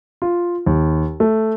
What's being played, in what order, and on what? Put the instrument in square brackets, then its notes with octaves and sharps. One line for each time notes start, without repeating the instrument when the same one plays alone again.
[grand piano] F4
D#2
A3